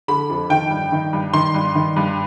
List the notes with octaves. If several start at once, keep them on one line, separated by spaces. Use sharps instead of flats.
D3 B5
F2
D#3 G5
G2
D#3
G2
D#3 C6
G2
D#3
G2